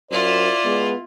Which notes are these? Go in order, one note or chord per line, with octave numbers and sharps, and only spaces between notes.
F#2 E4 F4 C5 D5
G#3 B3